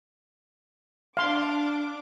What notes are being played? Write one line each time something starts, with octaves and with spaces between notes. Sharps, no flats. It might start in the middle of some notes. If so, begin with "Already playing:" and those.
D4 F5 C6 D6